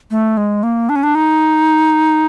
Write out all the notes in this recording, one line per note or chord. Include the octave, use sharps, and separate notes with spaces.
A3
G#3
A#3
D4
C#4
D4
D#4